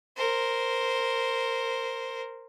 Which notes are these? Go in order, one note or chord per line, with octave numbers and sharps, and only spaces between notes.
A#4 C5